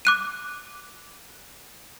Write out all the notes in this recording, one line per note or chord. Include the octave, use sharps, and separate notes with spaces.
D6 F#6 D#7